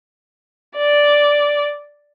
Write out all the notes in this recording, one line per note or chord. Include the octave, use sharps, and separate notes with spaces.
D5